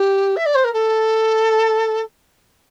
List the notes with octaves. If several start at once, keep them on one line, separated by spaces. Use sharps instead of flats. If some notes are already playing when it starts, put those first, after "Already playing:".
Already playing: G4
E5
D5
C5
A#4
A4